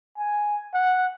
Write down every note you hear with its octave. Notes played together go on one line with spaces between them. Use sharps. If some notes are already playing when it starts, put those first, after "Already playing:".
G#5
F#5